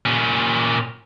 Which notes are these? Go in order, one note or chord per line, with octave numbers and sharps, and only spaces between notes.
A#2 C#4